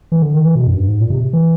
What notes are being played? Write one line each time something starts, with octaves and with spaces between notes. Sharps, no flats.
E3
D3
D#3
E3
B2
F#2
G2
G#2
A#2
C3
E3